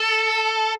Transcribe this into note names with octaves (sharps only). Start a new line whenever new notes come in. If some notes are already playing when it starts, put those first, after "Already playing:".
Already playing: A4